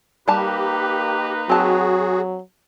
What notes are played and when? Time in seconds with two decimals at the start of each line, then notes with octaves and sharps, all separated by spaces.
0.28 G3 A#3 D#4 G4 B4 A5
1.49 F#3 C4 F#4 G#4 A5